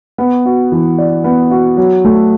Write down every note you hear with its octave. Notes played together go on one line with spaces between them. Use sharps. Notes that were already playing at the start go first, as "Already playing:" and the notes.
B3
F#4
E3
D5
B3
F#4
F#3
A3